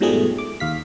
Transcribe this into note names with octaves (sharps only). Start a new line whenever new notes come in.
G#2 B2 F3 G3 A3 G#4
D6
D#2 F5 B6